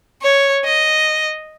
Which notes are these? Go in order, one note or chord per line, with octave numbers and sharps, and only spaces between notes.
C#5
D#5